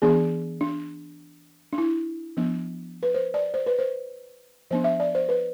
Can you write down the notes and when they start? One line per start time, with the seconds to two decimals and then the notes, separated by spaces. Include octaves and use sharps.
0.02 E3 B3 D4 G#4
0.61 D4
1.73 D4
1.78 E4
2.37 F3 B3 D4
3.03 B4
3.14 C5
3.34 D5
3.54 C5
3.66 B4
3.79 C5
4.71 F3 B3 D4 C5
4.84 E5
5.00 D5
5.15 C5
5.29 B4